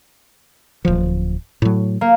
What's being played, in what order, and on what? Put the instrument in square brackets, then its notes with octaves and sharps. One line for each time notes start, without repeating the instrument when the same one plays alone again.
[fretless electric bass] D1 F3
A2 F#3
[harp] A#3